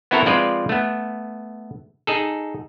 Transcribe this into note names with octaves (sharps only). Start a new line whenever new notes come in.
B3 C4 E4 F#4 A4 A#4
F3 G#3 C4 F4 B4 D5
A3 B3
D#4 G#4 A4